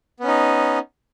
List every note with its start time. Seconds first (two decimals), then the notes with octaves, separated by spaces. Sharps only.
0.20 B3
0.24 C#4
0.28 D#4